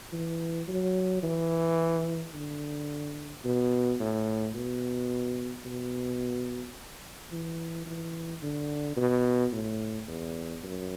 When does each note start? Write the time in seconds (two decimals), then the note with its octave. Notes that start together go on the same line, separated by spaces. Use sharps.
0.12 E3
0.68 F#3
1.23 E3
2.34 D3
3.45 B2
4.00 A2
4.55 B2
5.65 B2
7.32 E3
7.86 E3
8.43 D3
8.97 B2
9.52 A2
10.08 E2
10.64 F#2